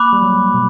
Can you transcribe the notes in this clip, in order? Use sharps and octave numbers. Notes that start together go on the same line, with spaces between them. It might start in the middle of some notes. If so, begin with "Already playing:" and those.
Already playing: A#3 B5 D6 F#6
G3
F#3
B2